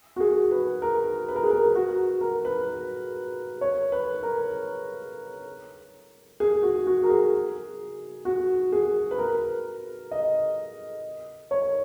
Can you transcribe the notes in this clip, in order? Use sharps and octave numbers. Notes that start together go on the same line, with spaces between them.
F#4
G#4
B4
A#4
B4
A#4
G#4
A#4
F#4
A#4
B4
C#5
B4
A#4
G#4
F#4
F#4
A#4
G#4
F#4
G#4
B4
A#4
D#5
C#5